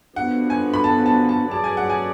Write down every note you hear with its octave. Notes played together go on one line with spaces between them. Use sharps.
D3 F3 B3 F#4 F#5
G#5
B5
A5
A5
A5
F#3 C#4 G#4 D5 A5
G#5
F#5
G#5